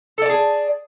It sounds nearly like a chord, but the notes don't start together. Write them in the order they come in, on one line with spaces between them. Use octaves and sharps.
A4 D5 A5 G#4